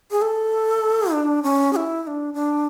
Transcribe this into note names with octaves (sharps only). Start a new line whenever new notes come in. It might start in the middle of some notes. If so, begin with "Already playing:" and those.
G#4
A4
D4
C#4
G#4
E4
E4
D4
D4